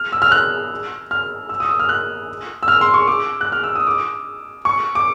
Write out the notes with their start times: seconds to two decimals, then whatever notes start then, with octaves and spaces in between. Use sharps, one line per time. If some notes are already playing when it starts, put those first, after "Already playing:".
Already playing: F6
0.12 E6
0.22 F6
0.31 F#6
1.11 F6
1.49 E6
1.60 D#6
1.69 E6
1.80 F6
1.89 F#6
2.63 E6
2.68 F6
2.81 C6
2.94 C#6
3.07 D6
3.41 F#6
3.52 F6
3.64 E6
3.75 D#6
3.87 D6
4.65 C#6
4.95 D6